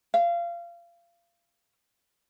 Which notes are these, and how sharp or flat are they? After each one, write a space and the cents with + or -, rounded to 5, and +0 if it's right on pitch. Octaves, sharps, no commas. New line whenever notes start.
F5 -25